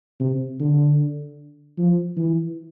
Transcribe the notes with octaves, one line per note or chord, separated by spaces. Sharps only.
C3
D3
F3
E3